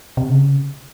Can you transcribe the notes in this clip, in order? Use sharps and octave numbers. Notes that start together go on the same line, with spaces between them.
C3
C#3